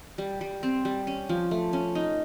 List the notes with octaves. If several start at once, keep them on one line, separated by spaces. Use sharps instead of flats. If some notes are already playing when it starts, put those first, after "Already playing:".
G3
G3
C4
G3
C#4
F3
A3
C#4
D#4